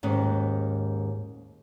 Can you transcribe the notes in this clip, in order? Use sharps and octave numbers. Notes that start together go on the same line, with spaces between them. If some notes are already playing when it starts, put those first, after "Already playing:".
D#2 G#2 C#4